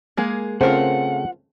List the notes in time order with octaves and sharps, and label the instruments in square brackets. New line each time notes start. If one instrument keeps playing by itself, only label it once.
[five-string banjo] G#3 A#3 G#4
[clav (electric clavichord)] C#3 A3 C4 [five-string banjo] F4 A#4 C5 [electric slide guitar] F#5